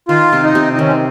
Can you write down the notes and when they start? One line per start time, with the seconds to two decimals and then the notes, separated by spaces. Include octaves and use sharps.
0.09 D#3 F4
0.33 C3
0.44 D#4
0.55 C3
0.73 D#4
0.79 D#3 C#4
0.88 C4